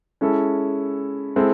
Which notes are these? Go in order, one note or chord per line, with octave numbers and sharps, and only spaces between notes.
G#3 C#4 E4 A4
G#3 C4 E4 A4